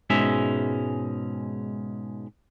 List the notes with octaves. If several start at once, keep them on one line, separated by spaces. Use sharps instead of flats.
G#2 B2 G#3 C#4 E5